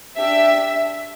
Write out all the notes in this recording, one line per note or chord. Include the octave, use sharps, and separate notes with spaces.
D4 G4 E5